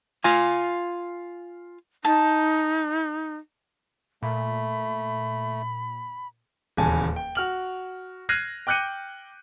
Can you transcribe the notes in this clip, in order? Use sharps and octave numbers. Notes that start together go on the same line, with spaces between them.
F4 F5 G#5
D#4 A5
A#2 A3 B5
D#1 E2 C#3 G#5 A5
G5
F#4 F6 F#7
F6 F#6 G#6 A#6 C7 D#7
G5 D6 F#6 G6 C#7 D#7